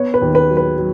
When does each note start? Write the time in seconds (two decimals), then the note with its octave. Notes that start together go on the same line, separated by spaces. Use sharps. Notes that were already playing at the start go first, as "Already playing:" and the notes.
Already playing: B3 C#5
0.14 B4
0.21 D#2
0.35 B4
0.50 F#3
0.57 B4
0.78 F#3